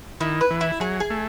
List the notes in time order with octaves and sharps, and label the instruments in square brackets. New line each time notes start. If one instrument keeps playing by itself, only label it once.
[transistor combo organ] D#3 [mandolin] E4
[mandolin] B4
[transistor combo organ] E3
[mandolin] E4
[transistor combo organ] F#3 [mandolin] G#4
[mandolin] G#4
[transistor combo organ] A3